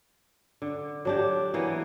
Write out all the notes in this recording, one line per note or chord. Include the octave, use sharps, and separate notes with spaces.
D3
F#3 D4 G4
E3 A#3 B3